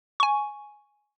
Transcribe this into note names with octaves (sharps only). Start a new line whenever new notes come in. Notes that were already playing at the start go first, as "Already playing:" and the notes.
G#5 C#6